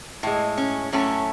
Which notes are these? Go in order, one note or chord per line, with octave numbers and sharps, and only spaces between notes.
A2 G#3
C#4
A2 F#3 A3 C#4